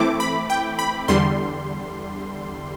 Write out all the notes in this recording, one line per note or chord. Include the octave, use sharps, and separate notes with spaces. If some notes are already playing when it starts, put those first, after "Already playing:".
Already playing: E3 A3 C4 E4 D6
B5
G5
B5
E2 D3 G3 C6